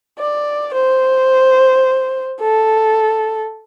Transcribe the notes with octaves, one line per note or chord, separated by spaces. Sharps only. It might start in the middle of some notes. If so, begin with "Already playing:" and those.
D5
C5
A4